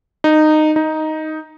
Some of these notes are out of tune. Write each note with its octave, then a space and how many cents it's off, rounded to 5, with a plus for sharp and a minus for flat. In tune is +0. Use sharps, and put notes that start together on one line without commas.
D#4 -15
D#4 +5